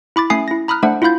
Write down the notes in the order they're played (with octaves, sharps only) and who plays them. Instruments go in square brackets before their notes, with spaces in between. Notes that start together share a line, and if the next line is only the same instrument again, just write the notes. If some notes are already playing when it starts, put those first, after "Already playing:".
[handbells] E4 B5 D6 A6
A3 C#4 E5 G#5 D#6 C7
E4 A#6
A#5 B5 D#6 F6 F#6
A3 D4 C5 F#5
E4 F4 F5 B5 G6 A6